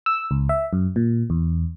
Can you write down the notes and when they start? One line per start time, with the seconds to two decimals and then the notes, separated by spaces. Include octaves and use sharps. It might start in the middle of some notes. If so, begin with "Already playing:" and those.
0.06 E6
0.31 C#2
0.49 E5
0.73 F#2
0.96 A#2
1.30 E2